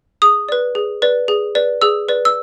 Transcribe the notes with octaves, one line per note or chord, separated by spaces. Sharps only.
G#4 D#6
B4 D5
G#4
B4 D5
G#4
B4 D5
G#4 E6
B4 D5
E6